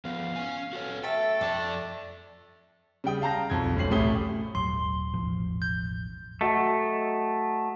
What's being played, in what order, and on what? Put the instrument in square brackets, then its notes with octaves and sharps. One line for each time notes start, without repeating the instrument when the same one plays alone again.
[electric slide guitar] F3 B3 [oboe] F5
[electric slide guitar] C#4 G#5
F#4 A4 C#5
[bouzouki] A3 E5 A5 [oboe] A4 [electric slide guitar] G5
[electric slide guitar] F2 A5 [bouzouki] A3 D4
[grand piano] C#3 G3 G5 D#6
F5 A5 A#5 G6 A#6
B1 F2 G#6
F1 B1 C#4 C7 F#7
A1 A3 C#4 G4 D#6 G7
[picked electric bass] D#1 G#1 F#3 [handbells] C6
[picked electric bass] E1 A1 F3
[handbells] G6
[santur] F#3 D#5 [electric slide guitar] A3